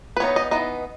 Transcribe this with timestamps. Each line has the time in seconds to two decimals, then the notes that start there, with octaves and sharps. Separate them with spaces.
0.17 B4
0.20 E3 B3 D#4 C#5
0.36 D#5
0.51 E3 B3 D#4 D#5